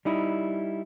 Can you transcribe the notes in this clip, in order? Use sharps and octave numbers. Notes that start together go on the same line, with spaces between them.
G3 D#4 E4